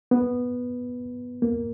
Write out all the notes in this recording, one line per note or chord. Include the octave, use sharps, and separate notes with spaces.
B3
A#3